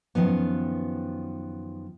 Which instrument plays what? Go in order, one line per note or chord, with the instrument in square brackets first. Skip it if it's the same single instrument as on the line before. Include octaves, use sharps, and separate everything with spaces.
[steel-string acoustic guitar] F#2 D#3 F3 B3